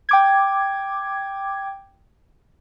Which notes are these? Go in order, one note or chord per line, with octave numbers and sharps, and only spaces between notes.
G5 D6 G#6